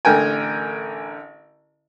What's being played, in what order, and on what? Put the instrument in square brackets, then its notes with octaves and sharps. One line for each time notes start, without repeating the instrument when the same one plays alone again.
[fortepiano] A1 D3 A#4 G5 G#5